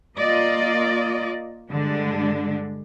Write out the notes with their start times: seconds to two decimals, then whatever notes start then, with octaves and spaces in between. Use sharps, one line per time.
0.18 A#3 F4 D5 D#5
1.70 G2 D3 G#3 D4